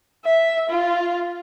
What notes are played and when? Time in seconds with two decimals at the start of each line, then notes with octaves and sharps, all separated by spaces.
0.25 E5
0.69 F4